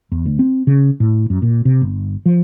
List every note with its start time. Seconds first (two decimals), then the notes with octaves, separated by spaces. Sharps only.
0.12 E2
0.26 D2
0.39 C4
0.67 C#3
1.00 A2
1.30 F#2
1.42 A#2
1.65 C3
1.82 G1
2.26 F3